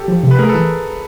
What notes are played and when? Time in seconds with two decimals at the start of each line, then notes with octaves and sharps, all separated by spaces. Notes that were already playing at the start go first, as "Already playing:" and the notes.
Already playing: G4 A4
0.08 F3
0.23 C3
0.31 B4
0.39 A3 G#4 A#4
0.49 A4 B4
0.54 E3